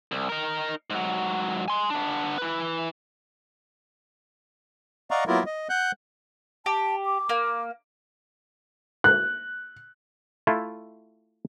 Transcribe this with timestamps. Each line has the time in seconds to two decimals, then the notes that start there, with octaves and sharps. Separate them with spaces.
0.12 C2
0.29 D#4 A#4
0.90 G#2 F#3
1.68 G#5 C6
1.90 B3 D4
2.38 E4 B4
5.11 D5 D#5 F5 F#5 A#5 C#6
5.27 F#3 A#3 B3 E4 F4 A#4
5.46 D#5
5.70 F#5 F#6 G6
6.66 G4 A5
7.06 D6
7.29 A#3
9.04 F#6
10.47 A3 E4 F4